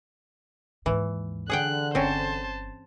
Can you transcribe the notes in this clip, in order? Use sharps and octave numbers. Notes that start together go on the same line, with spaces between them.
D#2 G#2 E3
D3 G#4 F#5 G5 F#6
G1 C4 C#4 C5 A5